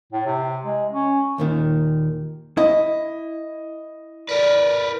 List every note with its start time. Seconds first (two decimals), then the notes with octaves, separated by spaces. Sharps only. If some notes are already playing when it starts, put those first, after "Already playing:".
0.13 A2
0.26 C3
0.64 G#3
0.91 C#4
1.38 D#2 A#2 D#3
2.57 E4 D#5
4.29 A#4 B4 D5